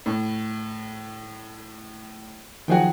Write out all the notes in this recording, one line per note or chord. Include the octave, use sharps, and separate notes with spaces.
A2
D#3 F3 F#3 F#4 G#4 G5